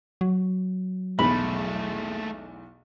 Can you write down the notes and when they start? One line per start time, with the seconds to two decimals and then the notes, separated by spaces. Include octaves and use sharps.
0.21 F#3
1.19 B1 E2 G#3 A3 B5